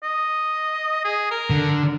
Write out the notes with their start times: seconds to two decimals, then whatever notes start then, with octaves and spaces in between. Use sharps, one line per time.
0.03 D#5
1.04 G#4
1.31 A#4
1.50 D3